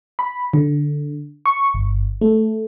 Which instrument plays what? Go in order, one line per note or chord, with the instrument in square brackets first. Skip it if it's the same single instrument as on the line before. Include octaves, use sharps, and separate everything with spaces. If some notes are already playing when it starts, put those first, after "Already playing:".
[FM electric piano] B5
D3
C#6
G1
A3